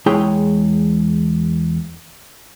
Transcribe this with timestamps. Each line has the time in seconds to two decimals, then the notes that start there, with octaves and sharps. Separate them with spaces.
0.06 E2 G#3 E4 G#4 C#5 G5